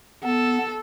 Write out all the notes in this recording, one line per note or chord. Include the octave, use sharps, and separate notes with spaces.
B3 A4